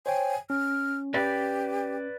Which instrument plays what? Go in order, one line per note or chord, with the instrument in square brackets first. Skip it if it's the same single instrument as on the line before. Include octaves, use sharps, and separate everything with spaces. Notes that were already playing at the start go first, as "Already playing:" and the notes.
[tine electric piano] C5 C#5 G5 [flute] G#5
[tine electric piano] C#4 [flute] F6
[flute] G4 [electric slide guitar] B4 D5